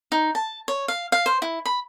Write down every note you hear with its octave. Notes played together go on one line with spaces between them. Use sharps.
D#4
A5
C#5
F5
F5
C5
E4
B5